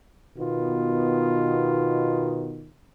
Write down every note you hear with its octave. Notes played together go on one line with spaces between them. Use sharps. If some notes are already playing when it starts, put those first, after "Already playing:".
B2 D#3 B3 F4